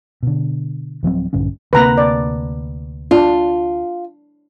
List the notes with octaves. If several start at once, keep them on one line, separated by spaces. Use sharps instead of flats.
B2 D3
D1 F3 F#3 C4
A#1 G2 D3 C#4
D2 C3 A#3 B4 A#5
D5
D4 F4